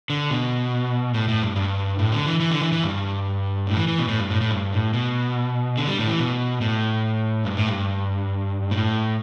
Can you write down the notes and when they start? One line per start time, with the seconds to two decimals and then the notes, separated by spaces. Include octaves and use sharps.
0.10 D3
0.31 B2
1.14 A2
1.28 A2
1.42 G2
1.56 G2
1.99 A2
2.12 D3
2.26 E3
2.40 E3
2.51 D3
2.61 E3
2.72 E3
2.83 G2
3.67 A2
3.77 E3
3.88 E3
3.99 B2
4.08 A2
4.20 G2
4.30 A2
4.41 A2
4.51 G2
4.73 A2
4.94 B2
5.77 D3
5.88 G3
5.99 A2
6.08 E3
6.20 B2
6.61 A2
7.45 G2
7.57 A2
7.68 G2
8.71 A2